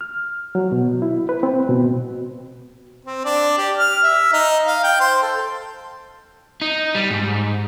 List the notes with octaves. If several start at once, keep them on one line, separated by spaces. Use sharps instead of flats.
F6
F#3
B2
E4
B4
C4
B2
C4
D4
G4
F6
E5
D#4
F5
G5
C5
A4
D#4
G3
G#2